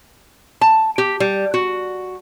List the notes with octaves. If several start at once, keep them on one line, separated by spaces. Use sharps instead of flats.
A5
G4
G3
F#4